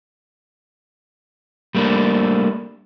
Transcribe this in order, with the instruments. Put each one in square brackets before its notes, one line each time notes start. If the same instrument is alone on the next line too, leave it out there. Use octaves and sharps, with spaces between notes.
[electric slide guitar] G3 A3 A#3 D4